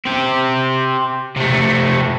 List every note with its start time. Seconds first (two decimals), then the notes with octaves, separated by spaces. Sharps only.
0.06 C4 G4
1.37 C3 A3